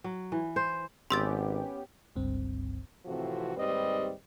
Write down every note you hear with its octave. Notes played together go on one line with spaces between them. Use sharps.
F#3
E3
C5
G#1 B3 C#4 G4 C6 E6 A6
G1 C#2 G2 C4
A2 C3 E3 F3 C4 F#4
D#2 G#2 G3 C4 B4 D#5